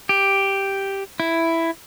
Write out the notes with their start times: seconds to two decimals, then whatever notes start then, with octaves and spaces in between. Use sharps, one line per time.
0.09 G4
1.20 E4